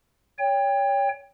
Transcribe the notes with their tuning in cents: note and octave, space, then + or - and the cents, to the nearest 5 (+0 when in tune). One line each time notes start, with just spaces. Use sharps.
C#5 +25 G5 +25